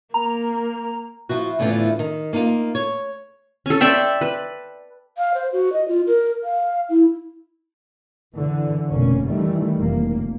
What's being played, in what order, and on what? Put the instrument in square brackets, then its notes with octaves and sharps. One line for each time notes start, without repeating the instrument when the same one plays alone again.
[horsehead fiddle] A#3 [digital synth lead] A#5
[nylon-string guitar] F3 E4 F#4
E2 A2 D3 E3 F3
D#3
A#3 D#4 F4 F5
C#5
[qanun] C#4 A4
D5 E5 G5 C6
B4
[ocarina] F5
C5
F#4
D#5
F4
A#4
F5
E4
[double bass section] D3 E3
F1 B2 A#3 C#4
D#3 E3 G3 A3
F1 A#3